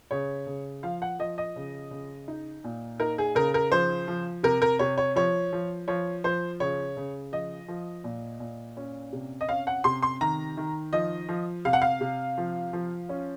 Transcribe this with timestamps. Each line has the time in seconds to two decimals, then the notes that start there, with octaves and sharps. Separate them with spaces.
0.11 C#3 C#5
0.47 C#3
0.83 F3 F5
1.02 F#5
1.19 F3 D#5
1.38 D#5
1.56 C#3
1.91 C#3
2.28 D#4
2.64 A#2
3.00 D#4 A#4
3.18 G#4
3.35 C#3 A#4
3.54 A#4
3.72 F3 C5
4.08 F3
4.43 C3 A#4
4.62 A#4
4.79 C3 C#5
4.98 C#5
5.16 F3 C#5
5.53 F3
5.88 F3 C#5
6.24 F3 C5
6.60 C#3 C#5
6.97 C#3
7.32 F3 D#5
7.68 F3
8.04 A#2
8.40 A#2
8.77 C#4
9.13 C3
9.41 D#5
9.48 C#4 F5
9.67 F#5
9.84 C3 C6
10.03 C6
10.21 D#3 A#5
10.57 D#3
10.92 F3 D#5
11.29 F3
11.65 C3 F5
11.73 F#5
11.82 F5
12.01 C3
12.38 F3
12.73 F3
13.09 C#4